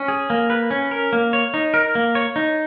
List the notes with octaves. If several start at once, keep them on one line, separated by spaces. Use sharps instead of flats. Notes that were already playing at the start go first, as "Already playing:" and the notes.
Already playing: C#4
G#4
A#3
B4
C#4
A#4
A#3
C#5
D#4
A#4
A#3
C#5
D#4